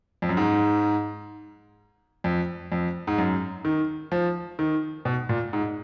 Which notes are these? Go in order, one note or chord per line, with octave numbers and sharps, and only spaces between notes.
F2
F#2
G#2
F2
F2
G#2
F#2
D#3
F3
D#3
B2
A#2
G#2